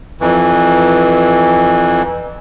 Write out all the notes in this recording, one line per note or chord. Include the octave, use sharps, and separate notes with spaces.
F2 E3